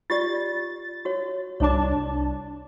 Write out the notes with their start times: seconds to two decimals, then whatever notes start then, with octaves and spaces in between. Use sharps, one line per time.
0.10 F4 G4 D5 A6
1.05 F#4 C#5
1.60 C2 D4 C#5 A5 D6